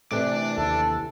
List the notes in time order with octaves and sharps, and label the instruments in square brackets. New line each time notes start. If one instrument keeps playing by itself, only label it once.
[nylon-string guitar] C3 E3 [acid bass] A3 [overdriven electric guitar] D4 D5
[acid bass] D#2 [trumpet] A4